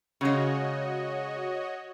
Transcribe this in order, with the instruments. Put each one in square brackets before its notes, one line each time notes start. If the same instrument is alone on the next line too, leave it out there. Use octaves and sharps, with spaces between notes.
[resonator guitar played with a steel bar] C#3 G#3 [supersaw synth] F#4 C#5 D#5